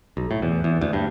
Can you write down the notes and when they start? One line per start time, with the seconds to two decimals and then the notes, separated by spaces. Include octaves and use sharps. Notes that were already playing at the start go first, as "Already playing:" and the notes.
0.17 B1
0.31 A2
0.42 E2
0.64 E2
0.81 D2
0.93 G2